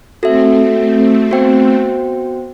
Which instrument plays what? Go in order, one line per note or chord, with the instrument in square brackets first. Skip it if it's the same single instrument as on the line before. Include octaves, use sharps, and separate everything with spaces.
[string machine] A3 C4 [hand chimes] F#4 A4 E5
[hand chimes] B3 F#4 C5 G5